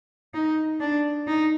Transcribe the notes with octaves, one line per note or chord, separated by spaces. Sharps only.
D#4
D4
D#4